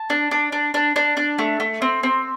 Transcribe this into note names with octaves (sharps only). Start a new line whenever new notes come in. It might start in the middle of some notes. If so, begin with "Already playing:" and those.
Already playing: A5
D4
D4
D4
D4
D4
D4
A3
A3
C4
C4